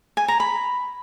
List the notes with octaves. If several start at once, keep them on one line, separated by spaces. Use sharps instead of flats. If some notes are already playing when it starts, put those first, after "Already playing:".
G#5
A#5
B5